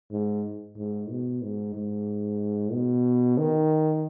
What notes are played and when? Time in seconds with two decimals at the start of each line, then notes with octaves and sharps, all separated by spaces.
0.11 G#2
0.77 G#2
1.10 B2
1.42 G#2
1.74 G#2
2.72 B2
3.38 D#3